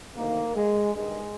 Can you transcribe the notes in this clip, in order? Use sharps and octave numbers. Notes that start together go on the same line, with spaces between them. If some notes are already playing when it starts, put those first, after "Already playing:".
D2 C3 D#3 A#3
G#3
G2 D#3 G#3